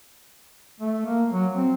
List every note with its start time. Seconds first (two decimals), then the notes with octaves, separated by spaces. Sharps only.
0.80 A3
1.06 A#3
1.32 F#3
1.55 C4